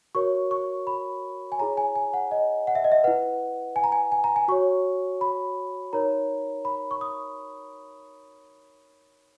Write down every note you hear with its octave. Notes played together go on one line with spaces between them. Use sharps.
F#4 A#4 C#5 C#6
C#6
B5
G#5
E4 G#4 C#5 A#5
G#5
G#5
F#5
D#5
F#5
E5
D#5
E5
E4 B4 F#5
G#5
A#5
G#5
G#5
A#5
G#5
F#4 C#5 C#6
B5
D#4 A#4 C#5 A#5
B5
C#6
D#6